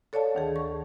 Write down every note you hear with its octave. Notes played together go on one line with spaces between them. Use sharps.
A4 C#5 D5 F5 A5
D2 D#3 G#4
C#6